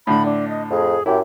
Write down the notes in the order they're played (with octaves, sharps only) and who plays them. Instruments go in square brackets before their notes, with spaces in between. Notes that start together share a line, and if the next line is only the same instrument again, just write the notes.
[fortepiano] A2 D3 [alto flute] B5
[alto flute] D4
D#5
[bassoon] F2 [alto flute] G#4
[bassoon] F#2 [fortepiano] E4 [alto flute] G4